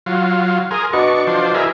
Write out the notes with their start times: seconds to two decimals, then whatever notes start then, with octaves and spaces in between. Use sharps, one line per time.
0.06 F#3 F4
0.71 G#4 A#4 C6 D#6
0.93 D4 F#4 B4 D#5 C#6
1.27 F3 D4 C5
1.54 E4 G#4 A#4